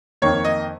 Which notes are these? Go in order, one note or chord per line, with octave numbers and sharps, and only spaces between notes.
F2 D#3 A#3 C#5
D#5